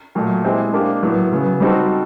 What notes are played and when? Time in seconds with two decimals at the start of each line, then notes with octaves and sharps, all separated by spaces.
0.15 A#2 F#3 A3
0.44 G#3 C4 E4 G4
0.73 A#3 D4 G4
1.02 A2 F#3 B3
1.32 C#3 F#3 B3
1.60 G3 C4 D#4 F#4 A4